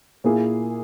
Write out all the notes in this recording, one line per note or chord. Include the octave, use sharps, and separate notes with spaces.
A#2 A#3 E4 G#4